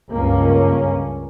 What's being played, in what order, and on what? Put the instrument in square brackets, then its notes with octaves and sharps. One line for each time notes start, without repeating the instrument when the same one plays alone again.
[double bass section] C#2 G2 A#3 C#4